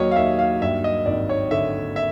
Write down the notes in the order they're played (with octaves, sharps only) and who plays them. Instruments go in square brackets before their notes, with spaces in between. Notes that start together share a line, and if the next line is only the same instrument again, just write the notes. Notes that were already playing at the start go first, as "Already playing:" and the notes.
Already playing: [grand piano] D#2 F#3 C#5 D#5
F5
D#2 E5
F5
G2 E5
D#5
G#1 D5
C#5
D3 E5
E5